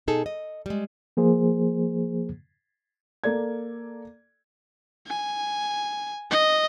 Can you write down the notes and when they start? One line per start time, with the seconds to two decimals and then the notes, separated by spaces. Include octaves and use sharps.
0.07 B2 D#4 G#4 A4
0.26 D#5
0.66 G3 G#3
1.17 F3 A#3 G#4 C5
3.24 A#3 A4 D5 G#6
5.07 G#5
6.31 D#5